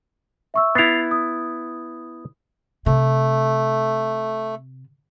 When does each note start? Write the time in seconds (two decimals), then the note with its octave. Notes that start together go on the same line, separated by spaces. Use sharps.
0.54 E5 C#6 E6
0.75 B3 E4 A6 C7 F7
1.11 D#6
2.86 C3 A3